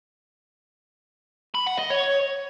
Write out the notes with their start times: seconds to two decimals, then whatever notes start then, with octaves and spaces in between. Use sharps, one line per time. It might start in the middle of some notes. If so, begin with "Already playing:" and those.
1.55 B5
1.67 F#5
1.79 D#5
1.91 C#5